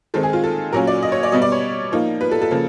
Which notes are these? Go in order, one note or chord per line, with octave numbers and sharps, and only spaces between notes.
D#3 G#3 C4 D#4 A4
G#4
F4
A4
A#2 F#3 A#3 C#4 A#4
D5
D#5
C#5
D5
B2 G3 B3 D#5
D5
C#5
F3 A#3 D#4
B4
A4
A4
C#3 F3 A#3